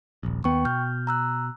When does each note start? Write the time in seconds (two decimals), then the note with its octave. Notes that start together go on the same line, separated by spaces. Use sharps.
0.23 D#1 A#1
0.44 D#2 B3 G5 C#6
0.65 B2 F6 G6
1.07 A#5 E6 F#6